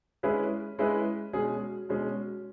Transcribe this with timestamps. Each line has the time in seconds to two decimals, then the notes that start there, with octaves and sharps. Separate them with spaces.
0.23 G#3 C#4 E4 G#4 B4
0.79 G#3 C#4 E4 G#4 B4
1.33 B2 G#3 C#4 G#4
1.89 B2 G#3 C#4 G#4